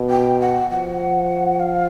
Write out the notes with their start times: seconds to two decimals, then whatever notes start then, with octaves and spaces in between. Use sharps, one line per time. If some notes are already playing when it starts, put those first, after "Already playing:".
Already playing: B2
0.10 G5
0.40 F#5
0.70 F3 F#5
1.60 F5